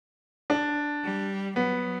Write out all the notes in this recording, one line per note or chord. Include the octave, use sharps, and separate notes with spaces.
D4
G3
F#3 B3